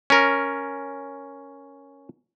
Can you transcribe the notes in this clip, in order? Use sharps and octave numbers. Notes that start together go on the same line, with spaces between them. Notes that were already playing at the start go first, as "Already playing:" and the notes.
C#4 A#4